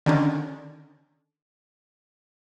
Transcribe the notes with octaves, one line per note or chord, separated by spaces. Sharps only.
D3 D#3 C#4 D4